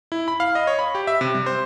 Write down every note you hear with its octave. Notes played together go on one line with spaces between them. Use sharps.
E4
B5
F5
D#5
C#5
B5
G4
E5
C3
G3
C5